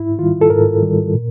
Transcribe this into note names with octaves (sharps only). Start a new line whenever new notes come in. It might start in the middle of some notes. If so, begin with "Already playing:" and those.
Already playing: G#2 E4
D#3 G3 F4
A4
G#2 A#4
D#3 G3
A#2